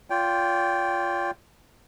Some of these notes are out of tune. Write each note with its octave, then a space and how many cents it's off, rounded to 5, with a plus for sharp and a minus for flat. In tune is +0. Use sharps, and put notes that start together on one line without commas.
F4 +0 D5 -45 G5 +0